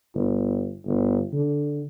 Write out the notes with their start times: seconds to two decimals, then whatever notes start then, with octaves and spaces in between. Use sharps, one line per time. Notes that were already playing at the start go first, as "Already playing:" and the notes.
0.14 G1
0.86 G1
1.32 D3